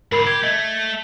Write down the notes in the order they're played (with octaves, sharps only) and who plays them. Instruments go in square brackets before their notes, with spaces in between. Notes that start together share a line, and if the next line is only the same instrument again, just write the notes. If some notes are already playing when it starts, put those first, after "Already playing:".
[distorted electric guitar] G#2 D3 [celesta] A#4 B5 C7
[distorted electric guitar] G4 [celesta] G#6
[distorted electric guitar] A3 [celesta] D#5 G#6